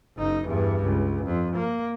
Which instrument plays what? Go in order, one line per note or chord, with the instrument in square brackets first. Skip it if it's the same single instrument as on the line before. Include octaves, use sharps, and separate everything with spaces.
[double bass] F#1 D#4
E2 G2
C#2
F2
A#3